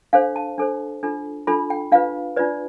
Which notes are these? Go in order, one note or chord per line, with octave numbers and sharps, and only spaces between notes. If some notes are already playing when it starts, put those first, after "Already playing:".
D4 A4 C5 F5
A5
D4 A4 C5
D4 F4 A4
D4 F4 A4 B5
G5
D4 F4 B4 F5
D4 F4 B4 D5